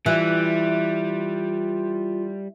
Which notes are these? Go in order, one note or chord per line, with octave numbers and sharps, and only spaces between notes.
E3 G3 F4